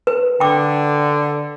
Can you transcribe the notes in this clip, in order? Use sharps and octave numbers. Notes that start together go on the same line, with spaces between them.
B4
D3 G5 D6